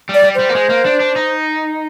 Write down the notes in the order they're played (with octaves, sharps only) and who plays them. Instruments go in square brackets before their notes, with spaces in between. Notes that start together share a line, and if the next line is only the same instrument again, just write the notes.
[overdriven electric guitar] G3
[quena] D5
[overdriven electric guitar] G3
[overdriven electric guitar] G3 [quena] C5
[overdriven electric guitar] A#3
G#3
A#3
D4
D4
D#4